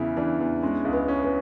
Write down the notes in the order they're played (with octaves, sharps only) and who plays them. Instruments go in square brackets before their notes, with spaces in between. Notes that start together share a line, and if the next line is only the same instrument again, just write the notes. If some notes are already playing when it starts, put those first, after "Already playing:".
Already playing: [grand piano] E2 C#3 [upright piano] E4
[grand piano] E3 [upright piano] D4
[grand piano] E2
[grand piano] G#3 [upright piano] C#4
[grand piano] C#2
[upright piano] B3
[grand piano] C#4
[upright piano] B3